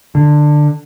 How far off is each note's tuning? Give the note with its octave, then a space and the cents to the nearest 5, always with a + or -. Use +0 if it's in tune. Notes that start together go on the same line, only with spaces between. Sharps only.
D3 +15